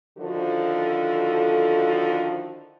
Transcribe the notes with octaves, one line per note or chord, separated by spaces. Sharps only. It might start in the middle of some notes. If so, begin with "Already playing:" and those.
D3 D#3 F3 E4 F#4 A4